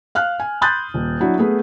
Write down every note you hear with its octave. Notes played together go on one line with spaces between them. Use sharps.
F5 F6 F#6
G#5
B5 C6 D#6 F#6 G6 A6
D#1
F#3 D4 E4 F#4
A3 B3 G#4 B4